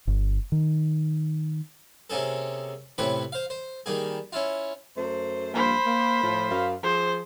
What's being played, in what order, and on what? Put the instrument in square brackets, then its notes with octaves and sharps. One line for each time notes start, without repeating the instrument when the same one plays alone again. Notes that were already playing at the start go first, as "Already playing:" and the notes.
[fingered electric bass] G1
D#3
[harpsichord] C3 A#3 C#4 G#4 A4
A2 C3 C4 C#4 B4 B5
C5 F5
C5
D#3 G3 A#3 G#4
C#4 E4 F4
[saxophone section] F#2 A3 C5
[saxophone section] G2 F3 A#3 [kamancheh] C5 B5
[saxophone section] A#3
A2 F3
F#2 F5
[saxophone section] F3 G#4 [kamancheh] C5